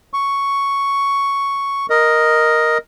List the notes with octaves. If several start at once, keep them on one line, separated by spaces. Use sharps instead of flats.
C#6
A#4 D#5